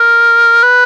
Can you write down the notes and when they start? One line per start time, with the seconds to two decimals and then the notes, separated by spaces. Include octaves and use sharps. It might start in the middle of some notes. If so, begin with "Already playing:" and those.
Already playing: A#4
0.63 B4